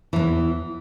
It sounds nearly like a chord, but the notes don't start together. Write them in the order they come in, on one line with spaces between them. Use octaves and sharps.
E3 G#2 E2